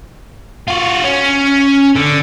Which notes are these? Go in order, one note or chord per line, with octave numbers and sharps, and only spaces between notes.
F4 F#4
C#4
D3